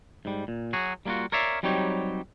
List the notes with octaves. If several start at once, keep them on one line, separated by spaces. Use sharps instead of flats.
G#2 G3
A#2
F#3 F#4 G#4
G3 A#3 C#4 F4 F#4
A#4 C#5 D5 E5 F5
F#3 G3 C4 D#4 G4 C#5